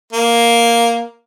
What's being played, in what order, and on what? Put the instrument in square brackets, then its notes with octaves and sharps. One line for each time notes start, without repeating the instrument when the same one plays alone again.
[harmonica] A#3